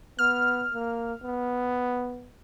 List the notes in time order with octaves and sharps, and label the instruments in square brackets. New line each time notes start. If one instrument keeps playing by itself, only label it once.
[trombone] B3 [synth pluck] F6
[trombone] A#3
B3